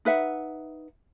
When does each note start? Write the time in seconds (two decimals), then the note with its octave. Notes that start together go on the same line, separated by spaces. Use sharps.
0.05 D#4 B4 E5 F#5